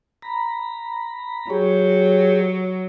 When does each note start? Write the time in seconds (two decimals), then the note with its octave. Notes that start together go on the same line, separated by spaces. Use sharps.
0.22 A#5 B5
1.50 F#3 G4 G#4 C#5